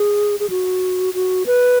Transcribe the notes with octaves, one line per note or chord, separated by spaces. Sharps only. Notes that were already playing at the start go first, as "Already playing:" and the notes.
Already playing: G#4
G#4
F#4
F#4
B4